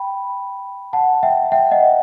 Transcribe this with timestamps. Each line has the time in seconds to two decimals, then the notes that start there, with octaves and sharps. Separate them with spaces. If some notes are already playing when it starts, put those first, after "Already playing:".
Already playing: G5 B5
0.93 F#5 A5
1.23 E5 G5
1.52 E5 G5
1.71 D#5 F#5